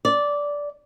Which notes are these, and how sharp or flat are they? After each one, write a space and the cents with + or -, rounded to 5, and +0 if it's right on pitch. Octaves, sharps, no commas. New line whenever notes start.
D5 -10